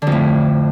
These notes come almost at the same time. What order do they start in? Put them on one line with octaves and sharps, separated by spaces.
D3 F2 A2